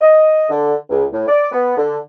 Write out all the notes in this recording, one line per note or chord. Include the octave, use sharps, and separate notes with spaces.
D#5
D3
C#2
A2
D5
B3
D3